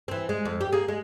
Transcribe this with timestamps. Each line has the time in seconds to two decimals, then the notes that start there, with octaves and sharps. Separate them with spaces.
0.08 E3 C4
0.29 G#3
0.45 F2
0.61 G4
0.73 A#3 G#4
0.88 G#3